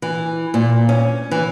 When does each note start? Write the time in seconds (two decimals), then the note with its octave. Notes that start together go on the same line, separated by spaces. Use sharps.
0.02 E3
0.54 A#2
0.89 C#4
1.31 E3